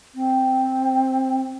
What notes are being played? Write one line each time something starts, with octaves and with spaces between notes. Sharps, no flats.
C4